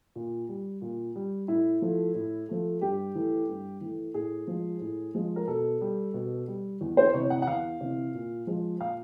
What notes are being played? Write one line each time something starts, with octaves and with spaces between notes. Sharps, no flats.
A#2
G3
A#2
G3
A2 E4
F3 A3
A2
F3 A3
G2 G4
E3 A3
G2
E3 A3
A2 G#4
F3 G#3
A2
F3 G#3
A#4
B2 A4
G3
B2
G3
E2
C5
C3 E3 C#5
F#5
F#5
E2 F5
C3 E3
A#2
F3 G#3
A#2 F5